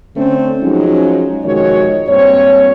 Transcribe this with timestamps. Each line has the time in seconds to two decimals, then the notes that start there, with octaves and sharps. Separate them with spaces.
0.17 D3 A3 C4 C#4
0.61 F3 F#3 G#3 C#4 D#4
1.44 F2 C3 D#3 G#3 F#4 C#5
2.08 G2 A#2 C4 C#5